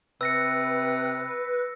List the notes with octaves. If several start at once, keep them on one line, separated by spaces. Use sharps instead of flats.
C3 B4 E6 A#6 C#7